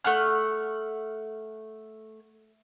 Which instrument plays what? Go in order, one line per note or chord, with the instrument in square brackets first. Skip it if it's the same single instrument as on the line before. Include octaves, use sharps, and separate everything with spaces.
[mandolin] A3 F#5 F6